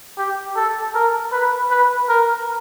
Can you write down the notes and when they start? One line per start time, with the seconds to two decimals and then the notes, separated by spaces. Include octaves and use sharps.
0.18 G4
0.56 A4
0.95 A#4
1.32 B4
1.71 B4
2.09 A#4